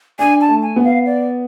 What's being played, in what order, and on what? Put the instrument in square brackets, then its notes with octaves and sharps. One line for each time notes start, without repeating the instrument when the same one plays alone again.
[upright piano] D4 [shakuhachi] G#5
[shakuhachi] A5
[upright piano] A3
[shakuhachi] G#5
[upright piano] B3
[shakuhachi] F5
D5